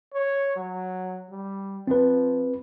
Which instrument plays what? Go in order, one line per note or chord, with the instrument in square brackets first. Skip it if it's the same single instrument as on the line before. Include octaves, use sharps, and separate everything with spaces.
[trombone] C#5
F#3
G3
[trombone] F3 [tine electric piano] C4 B4